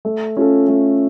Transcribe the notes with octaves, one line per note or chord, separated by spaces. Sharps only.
A3
C#4 F4 A4
A3